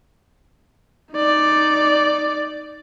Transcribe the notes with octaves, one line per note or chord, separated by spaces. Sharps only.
D#4 D5